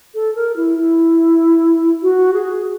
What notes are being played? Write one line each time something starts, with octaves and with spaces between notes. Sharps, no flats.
A4
A#4
E4
E4
F#4
G#4